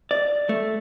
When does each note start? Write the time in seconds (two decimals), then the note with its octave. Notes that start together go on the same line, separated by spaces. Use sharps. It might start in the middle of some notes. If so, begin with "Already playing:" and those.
0.11 D5
0.49 A3